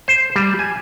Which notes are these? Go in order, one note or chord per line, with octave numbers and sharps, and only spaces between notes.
C5
G3
G#5